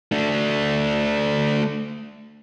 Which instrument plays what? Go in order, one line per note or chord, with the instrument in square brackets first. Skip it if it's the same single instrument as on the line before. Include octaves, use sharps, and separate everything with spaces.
[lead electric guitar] A3 D4